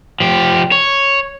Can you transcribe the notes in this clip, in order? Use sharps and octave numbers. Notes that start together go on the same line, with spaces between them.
F3 G4
C#5